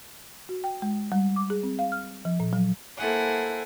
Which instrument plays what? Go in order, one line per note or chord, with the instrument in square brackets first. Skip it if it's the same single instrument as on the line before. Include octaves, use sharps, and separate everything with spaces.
[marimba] F#4
G5
G#3
G3
D6
G#4
C4
F5
F6
F3
A#2
F#3
[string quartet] A#3 E4 A4 C5 F#5 G#5